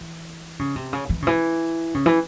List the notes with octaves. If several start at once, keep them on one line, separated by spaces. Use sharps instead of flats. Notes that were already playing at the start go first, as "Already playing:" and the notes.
Already playing: E3
C#3
C3
C#3
E3
C#3
E3
C#3
E3